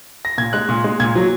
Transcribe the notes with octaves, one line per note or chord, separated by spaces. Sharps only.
A#6
A#2 G#6
G#3 F#6
A#2
G#3
A#2 G#6
F#3